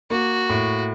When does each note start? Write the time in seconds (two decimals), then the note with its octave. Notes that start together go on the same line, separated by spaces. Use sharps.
0.10 A#3 F#4
0.49 A2